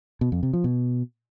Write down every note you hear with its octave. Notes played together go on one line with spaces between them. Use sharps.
B2
F2
C3
F3
B2